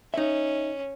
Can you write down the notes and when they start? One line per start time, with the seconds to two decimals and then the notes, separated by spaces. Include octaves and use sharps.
0.14 C#4 D#4 E5